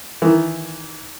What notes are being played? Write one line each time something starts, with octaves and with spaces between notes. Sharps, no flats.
D#3 E3